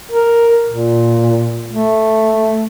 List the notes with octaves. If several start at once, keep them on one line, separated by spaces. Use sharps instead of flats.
A#4
A#2
A3